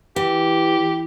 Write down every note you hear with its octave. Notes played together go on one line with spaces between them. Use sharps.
E3 G4